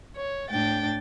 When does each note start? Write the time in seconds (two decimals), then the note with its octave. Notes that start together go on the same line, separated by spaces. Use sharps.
0.17 C#5
0.50 A2 D4 G5 A6